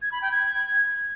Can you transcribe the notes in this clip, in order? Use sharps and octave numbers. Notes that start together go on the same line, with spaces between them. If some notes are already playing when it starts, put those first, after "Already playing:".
G#6
B5
G5
G#6